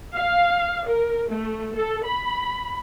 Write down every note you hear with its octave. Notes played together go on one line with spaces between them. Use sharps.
F5
A#4
A3
A4
B5